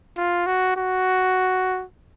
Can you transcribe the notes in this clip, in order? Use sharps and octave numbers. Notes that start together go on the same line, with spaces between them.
F4
F#4
F#4